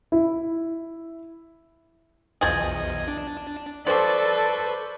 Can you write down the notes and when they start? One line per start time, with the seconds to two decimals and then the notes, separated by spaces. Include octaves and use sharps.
0.12 E4
2.41 B1 E2 F3 G#4 D#5
3.08 D4
3.87 F3 G3 A4 B4 C5 D5 C#6